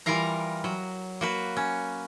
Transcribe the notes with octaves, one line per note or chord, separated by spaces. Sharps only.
E3 G3 F4 A#4 F5 A#5
F#3
A#3 F#4 B4
C#4